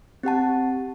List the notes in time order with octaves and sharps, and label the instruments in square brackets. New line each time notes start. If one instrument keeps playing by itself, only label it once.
[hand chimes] C4 G4 F#5 A5